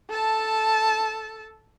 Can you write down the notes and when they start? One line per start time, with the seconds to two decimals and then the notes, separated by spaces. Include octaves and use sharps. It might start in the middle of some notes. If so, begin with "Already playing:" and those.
0.10 A4 A5